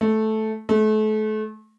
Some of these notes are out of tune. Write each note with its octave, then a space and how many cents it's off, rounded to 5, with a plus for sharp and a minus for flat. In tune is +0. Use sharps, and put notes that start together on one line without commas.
A3 -10
A3 -35